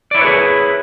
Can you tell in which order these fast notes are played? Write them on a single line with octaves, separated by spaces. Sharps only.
D5 E4 C#5 B4 G#4